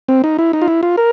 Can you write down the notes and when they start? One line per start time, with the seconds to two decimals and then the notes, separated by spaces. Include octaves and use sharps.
0.09 C4
0.24 D#4
0.38 E4
0.53 D#4
0.62 F4
0.68 E4
0.83 F4
0.97 A#4